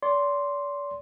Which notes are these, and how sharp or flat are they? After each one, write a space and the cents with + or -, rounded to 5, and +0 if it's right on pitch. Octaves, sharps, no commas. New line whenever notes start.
D5 -40 C6 +0